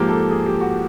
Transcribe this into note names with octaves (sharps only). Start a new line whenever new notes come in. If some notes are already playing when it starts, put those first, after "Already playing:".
Already playing: G#2 F3 A#3 G4
A4
G#4
G4
F#4